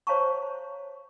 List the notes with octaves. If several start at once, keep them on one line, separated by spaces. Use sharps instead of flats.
C5 C#5 F5 A5 A#5 C#6